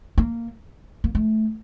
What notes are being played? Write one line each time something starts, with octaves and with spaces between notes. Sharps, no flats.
A#3
A#3
A3